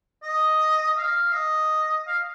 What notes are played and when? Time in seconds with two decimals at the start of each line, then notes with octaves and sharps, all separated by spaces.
0.23 D#5
0.97 F5
1.33 D#5
2.07 F5